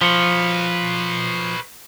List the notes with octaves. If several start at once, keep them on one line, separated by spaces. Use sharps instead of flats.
F3 B4 C#5